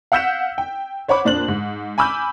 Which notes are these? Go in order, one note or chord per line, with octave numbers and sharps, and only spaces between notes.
F5 F#5 E6 G6 B6 E7
G5
C5 C#5 F#5 B5 D6
F2 A#2 D4 C5 F#6 F#7
G#2
G#5 B5 D6 E6 F6 G6